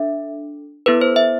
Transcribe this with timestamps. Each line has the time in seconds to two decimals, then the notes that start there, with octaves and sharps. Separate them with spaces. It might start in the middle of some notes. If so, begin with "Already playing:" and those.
Already playing: D4 A4 E5
0.86 B3 E4 A4 B4
1.01 C5
1.16 E5